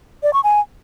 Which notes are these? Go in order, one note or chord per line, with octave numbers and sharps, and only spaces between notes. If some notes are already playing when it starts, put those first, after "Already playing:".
D5
C#6
G#5